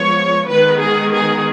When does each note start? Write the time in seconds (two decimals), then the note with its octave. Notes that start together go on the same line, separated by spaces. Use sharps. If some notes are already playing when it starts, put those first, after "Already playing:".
Already playing: F3 G#3 B3 C#5
0.47 D#3 G#3 B3 B4
0.79 G#4
1.13 G#4